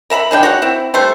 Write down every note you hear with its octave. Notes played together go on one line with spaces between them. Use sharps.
A#4 E5 A#5 B5
D#3 G#3 D4 G5
F#4 C#5 F#5
C4 E4
G3 A3 C5